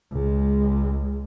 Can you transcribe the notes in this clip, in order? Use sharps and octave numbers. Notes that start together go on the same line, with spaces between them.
C#2 G#3